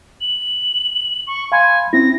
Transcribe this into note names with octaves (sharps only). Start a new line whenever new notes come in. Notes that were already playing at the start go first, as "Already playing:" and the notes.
F#7
C#6
F5 G#5 B5 C6
C4 C#4 E4 A#6